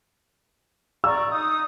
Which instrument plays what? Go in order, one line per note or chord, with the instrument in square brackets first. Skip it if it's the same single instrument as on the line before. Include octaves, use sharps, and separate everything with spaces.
[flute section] D5 A#5 C#6 [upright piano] E6
[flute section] D#4 D#6